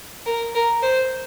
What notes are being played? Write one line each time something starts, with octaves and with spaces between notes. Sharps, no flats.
A#4
A#4
C5